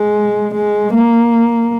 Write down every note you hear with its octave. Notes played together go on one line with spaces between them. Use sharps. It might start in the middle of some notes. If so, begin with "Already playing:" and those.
Already playing: G#3
G#3
A#3